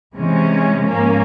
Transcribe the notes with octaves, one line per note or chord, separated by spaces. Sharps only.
C3 E3 G#3 C#4
G#2 F3 A#3 C#4